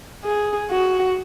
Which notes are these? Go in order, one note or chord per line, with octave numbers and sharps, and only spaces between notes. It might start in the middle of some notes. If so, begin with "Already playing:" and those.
G#4
F#4